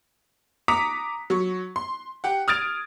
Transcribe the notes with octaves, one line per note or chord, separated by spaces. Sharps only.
A#5 D6 D#6 B6 C#7 F7
F#3 C#6
C6
G4 F#5
D#6 F6 G#6 A6 D7 F7